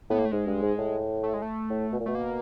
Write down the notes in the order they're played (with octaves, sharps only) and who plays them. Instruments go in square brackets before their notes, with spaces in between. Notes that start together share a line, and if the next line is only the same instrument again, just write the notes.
[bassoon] A2 [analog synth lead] B3
[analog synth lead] A#3
A3
[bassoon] G#2 [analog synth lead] G#3
[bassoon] G2
G#2
A2
[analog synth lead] A3
G#3
A3
[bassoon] A2
B2
A#2
[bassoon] B2 [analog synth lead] A3
[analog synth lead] A#3